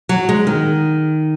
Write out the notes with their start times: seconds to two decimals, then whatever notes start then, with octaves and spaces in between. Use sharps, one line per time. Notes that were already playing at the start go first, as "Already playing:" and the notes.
0.09 F#3
0.29 G#3
0.47 D#3